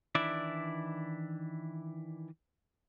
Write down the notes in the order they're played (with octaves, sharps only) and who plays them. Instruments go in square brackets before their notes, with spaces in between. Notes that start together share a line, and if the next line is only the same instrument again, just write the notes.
[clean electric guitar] D#3 E3 D4 E4 D5 E5